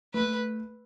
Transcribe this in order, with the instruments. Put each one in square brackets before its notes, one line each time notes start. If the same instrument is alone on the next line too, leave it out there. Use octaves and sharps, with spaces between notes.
[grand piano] A3 [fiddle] B4